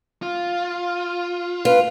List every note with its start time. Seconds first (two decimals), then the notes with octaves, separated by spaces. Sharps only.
0.22 F4
1.65 F4 B4